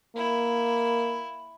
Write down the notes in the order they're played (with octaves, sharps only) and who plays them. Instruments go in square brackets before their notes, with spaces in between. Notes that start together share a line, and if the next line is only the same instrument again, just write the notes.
[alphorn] A#3 [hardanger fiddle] E4